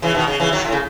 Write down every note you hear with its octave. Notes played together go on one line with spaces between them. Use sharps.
C#3 E3
B2 D#3
C#3
C#3 E3
D#3 F#3
A2
C#3